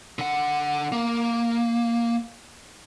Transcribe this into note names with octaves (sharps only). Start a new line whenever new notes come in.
D3 F#5
A#3